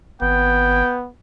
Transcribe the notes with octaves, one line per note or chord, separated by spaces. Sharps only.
G#1 B3 G5